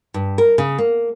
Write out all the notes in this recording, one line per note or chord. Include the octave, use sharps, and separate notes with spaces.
G2
A#4
C#3
A#3